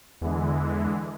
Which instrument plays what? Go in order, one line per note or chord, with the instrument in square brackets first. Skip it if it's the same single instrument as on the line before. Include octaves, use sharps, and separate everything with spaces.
[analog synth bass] E2 [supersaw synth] D3 E3 G#3